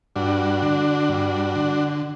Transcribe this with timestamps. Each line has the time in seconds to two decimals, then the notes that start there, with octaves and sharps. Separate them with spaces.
0.16 G2 D4 F#4
0.62 D3
1.09 G2
1.55 D3